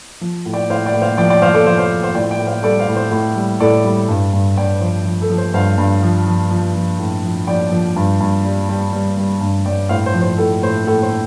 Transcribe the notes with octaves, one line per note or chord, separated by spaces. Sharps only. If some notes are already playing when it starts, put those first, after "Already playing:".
F3
A2
D5 G5
A2 C5 F5
D5 G5
A2
C5 F5
F3 D5 G5
D5 G5
F3 C5 F5
A4 D5
F3 C5 F5
C5 F5
F3
C5 F5
A2 D5 G5
D5 G5
A2
C5 F5
G3 A4 D5
C5 F5
A2
C5
A2
G3
A2 A4 D5
G3
G2
G2
G2 D5 G5
F3 C5
F3
A4
F3
C5
G2 C5 F5
G2
F3
F3
F3
F3
A2
F3
F3 D5 G5
F3
G2
G2
G3
G3
G3
G3
G2
G2 D5 G5
A2 C5 F5
C5
F3
C5
A2 A4
A2 C5
A2 A4
C5